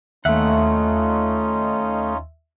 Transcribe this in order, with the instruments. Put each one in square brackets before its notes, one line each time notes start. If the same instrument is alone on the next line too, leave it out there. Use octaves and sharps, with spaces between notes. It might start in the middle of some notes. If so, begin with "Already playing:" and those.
[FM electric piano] D#2 E5 [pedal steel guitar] A3 F#5 [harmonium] C#4 D#4 F4